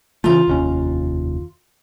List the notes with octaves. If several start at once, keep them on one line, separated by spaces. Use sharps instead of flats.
C#3 E3 A3 F4 A#5
F1 D#2 C#4